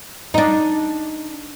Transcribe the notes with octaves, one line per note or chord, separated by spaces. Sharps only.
D4 D#4